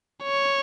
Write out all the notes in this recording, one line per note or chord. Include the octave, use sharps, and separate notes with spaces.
C#5